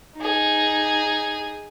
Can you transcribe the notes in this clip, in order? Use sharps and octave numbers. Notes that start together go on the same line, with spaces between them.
D#4 G#4